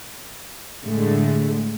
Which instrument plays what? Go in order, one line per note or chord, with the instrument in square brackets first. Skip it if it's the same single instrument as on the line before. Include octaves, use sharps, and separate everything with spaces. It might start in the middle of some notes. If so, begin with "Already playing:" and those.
[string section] A2 D3 G#3 A3